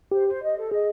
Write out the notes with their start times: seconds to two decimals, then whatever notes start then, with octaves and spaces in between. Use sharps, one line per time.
0.12 G4 C5
0.27 C5
0.41 D#5
0.57 A4
0.71 G#4 D#5